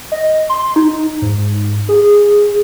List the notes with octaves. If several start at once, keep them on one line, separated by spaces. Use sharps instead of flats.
D#5
C6
D#4
G#2
G#4